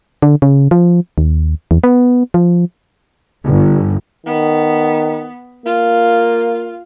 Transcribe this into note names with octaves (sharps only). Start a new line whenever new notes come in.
D3
C#3
F3
D#2
E2
B3
F3
G1
D#3 B3
A#3 F4